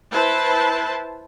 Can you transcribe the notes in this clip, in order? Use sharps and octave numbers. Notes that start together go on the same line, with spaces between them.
E4 B4 C5 A5